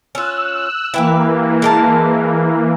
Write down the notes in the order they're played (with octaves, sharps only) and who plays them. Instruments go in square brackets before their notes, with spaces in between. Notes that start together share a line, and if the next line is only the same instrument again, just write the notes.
[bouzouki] C#4 F4 [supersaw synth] E6 F#6
[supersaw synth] E3 A#3 [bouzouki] E4 G4 B4
[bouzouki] G#3 A#4 A5